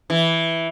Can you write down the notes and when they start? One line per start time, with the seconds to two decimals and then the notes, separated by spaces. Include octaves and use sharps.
0.10 E3